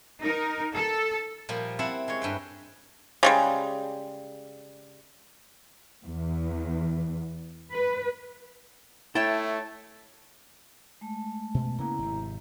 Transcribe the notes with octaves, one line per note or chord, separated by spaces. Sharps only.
D#4 A#4
A4
A#2 F3 G3 A#3
C4 E4 F#5 A5
G#3 C#5
G2 B4 G5
C#3 G3 G#3
E2
B4
A3 E4 C#5 G5 A5
G#3 A3 A5
B2
C#3 A#3 B3 E4 A#5
G#1 C3